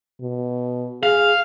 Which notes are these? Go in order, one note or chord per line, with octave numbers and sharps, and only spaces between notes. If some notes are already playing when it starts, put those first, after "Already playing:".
B2
G#4 F5